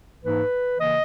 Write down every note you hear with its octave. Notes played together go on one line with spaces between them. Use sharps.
G#2 E3 A#3 D#4 B4
C#3 E3 A#3 D#5